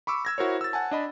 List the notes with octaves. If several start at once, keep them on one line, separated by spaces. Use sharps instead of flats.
B5 C#6 D6 E6
E6 G#6 A#6
E4 F#4 A#4 C5 C#5
E6 A6
F#5 G#5 A5
D4 D#5 B5